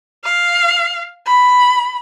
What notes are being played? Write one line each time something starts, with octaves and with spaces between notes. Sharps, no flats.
F5
B5